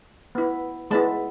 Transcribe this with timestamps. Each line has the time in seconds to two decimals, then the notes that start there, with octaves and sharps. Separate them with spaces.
0.35 B3 E4
0.91 G#3 B3 E4 A5